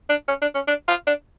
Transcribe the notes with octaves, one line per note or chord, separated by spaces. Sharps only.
D4
C#4
D4
C#4
D4
F4
D4